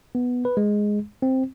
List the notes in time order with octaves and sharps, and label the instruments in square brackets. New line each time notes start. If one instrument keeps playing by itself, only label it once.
[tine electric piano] B3
B4
G#3
C4